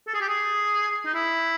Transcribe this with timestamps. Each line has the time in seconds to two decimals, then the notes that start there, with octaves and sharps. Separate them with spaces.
0.07 A4
0.14 G#4
0.21 G4
0.29 G#4
1.06 D#4
1.14 E4